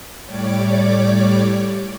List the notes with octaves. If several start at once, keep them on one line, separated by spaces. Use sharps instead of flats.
A2 G3 C#5 D5 D6